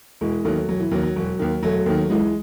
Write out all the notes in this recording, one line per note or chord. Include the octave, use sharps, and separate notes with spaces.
E1 E3 G#3
D#2 D#3 F#3 A3
E1 F#3
E3
D#2 D#3 F#3
F#3
E1 F#3
D#2 D#3
E1 F#3 A3
D#2 D#3
C#2 E3 G#3